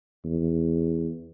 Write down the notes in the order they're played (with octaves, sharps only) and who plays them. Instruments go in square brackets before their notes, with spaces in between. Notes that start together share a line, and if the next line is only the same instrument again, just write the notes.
[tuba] E2